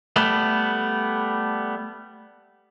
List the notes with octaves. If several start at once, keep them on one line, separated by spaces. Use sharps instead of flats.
G3 A3 B3